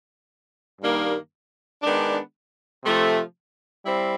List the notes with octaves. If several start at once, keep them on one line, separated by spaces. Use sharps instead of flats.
G2 D#3 G3 A#3 D#4
D#3 G#3 B3 D4
C3 F3 A3
G3 C4 E4